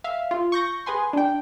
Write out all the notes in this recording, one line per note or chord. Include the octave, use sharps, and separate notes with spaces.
E5 F5
F4
C#6 G6 A#6
G#4 B4 G#5 C6
D4 G5